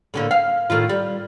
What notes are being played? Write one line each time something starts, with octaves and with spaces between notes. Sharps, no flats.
A2 D3 A#3
F5
A2 D#3 F4
G3